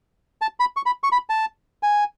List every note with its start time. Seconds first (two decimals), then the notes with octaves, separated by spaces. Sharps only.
0.42 A5
0.60 B5
0.77 C#6
0.86 B5
1.04 C#6
1.12 B5
1.30 A5
1.83 G#5